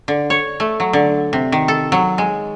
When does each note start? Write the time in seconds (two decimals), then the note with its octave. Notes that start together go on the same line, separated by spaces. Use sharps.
0.08 D3
0.30 C#5
0.60 A3
0.80 F#3
0.93 D3
1.33 C3
1.52 D#3
1.68 A4
1.92 F#3
2.18 G#3